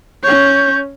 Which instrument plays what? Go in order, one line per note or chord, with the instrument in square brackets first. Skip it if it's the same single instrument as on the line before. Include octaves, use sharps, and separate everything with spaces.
[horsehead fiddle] C#4 C#5 [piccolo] G6